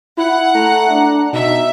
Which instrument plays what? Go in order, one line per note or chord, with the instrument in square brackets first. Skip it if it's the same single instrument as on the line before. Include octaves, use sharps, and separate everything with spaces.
[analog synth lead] E4 [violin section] F#5
[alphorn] A3 [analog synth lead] A#5
[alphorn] D4
[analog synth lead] B2 [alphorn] D#4 [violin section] E5